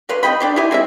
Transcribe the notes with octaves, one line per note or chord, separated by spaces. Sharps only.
G4 B4 F5 C6
C4 D#5 G5 B5
D4 G4 C5
E4 F4 G4 G#5
G#3 C4 E4 E5